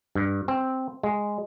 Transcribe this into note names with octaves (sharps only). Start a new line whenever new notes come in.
G2
C4
G#3